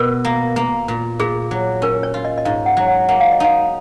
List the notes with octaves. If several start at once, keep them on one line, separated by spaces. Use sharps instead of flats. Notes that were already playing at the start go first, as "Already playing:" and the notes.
Already playing: B2 A#4
A#3
A#3
A#2
A#2 G#4
F#3
C#4 A#4
C#5
F4
D#5
D#5
G#2 F5
F#5
F#3
F#5
A#3 F#5
F5
D#5
D#4 F5